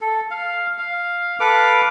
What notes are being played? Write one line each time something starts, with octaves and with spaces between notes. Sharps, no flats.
A4
F5
F5
A4 B4 F5 D6